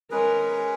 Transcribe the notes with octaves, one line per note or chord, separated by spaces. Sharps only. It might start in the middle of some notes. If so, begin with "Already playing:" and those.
G#3 C#4 G#4 A#4 B4